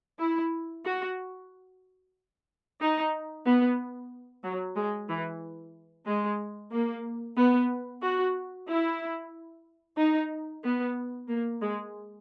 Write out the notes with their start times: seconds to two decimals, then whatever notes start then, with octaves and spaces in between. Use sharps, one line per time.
0.19 E4
0.84 F#4
2.80 D#4
3.45 B3
4.43 F#3
4.76 G#3
5.09 E3
6.06 G#3
6.72 A#3
7.36 B3
8.02 F#4
8.68 E4
9.97 D#4
10.63 B3
11.28 A#3
11.61 G#3